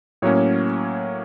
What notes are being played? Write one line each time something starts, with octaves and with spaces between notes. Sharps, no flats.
A2 F#3 A#3 C#4 C#5